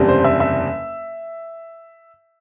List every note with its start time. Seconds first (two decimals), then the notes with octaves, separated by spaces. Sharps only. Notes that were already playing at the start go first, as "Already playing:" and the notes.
Already playing: F#1 E2 C3 G3 D4
0.08 C5
0.24 E5
0.40 E5